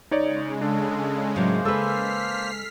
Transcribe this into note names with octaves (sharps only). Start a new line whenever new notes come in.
C#3 G#3 D#4 C#5 D5
D4 A4
A2 F#3 A#3 C#4 C5
G#3 A4 B4 E6 F6 B6 C7